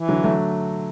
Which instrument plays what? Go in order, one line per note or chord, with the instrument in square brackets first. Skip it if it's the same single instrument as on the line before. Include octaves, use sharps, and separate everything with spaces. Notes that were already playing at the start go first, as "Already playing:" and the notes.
Already playing: [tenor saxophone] E3
[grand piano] D3 F#3
F#3 A3